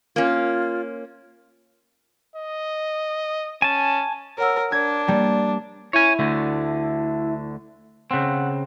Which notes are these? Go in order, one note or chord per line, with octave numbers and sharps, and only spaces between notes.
A#3 C#4 F4
D#5
C#4 G#5 A5
A#4 C#5 F#5 E6
D4 A#4 G#6
G3 A#3 D5
E4 C#5 G#5
D2 D3 A3
C#3 C4 F#5